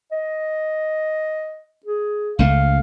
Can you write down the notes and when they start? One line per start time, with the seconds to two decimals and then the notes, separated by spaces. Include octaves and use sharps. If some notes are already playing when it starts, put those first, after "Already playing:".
0.12 D#5
1.86 G#4
2.39 C#2 A3 F5